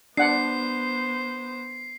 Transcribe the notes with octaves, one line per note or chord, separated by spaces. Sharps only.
B3 D4 C5 F#5 C7